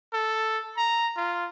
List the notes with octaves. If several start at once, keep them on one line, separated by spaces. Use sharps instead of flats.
A4
A#5
F4